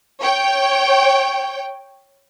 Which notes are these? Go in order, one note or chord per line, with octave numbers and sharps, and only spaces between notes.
C#5 G5